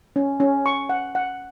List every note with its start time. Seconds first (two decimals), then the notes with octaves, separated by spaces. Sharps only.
0.16 C#4
0.40 C#4
0.66 C#6
0.89 F#5
1.15 F#5